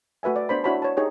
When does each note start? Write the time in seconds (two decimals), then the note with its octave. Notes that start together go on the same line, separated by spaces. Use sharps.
0.23 A3 F#4 B4 E5 G#5
0.36 D5
0.49 B3 D4 C5 B5
0.64 D4 E4 F#4 C#5 A5 B5
0.82 C#5 A5
0.97 D#4 G4 G#4 C#5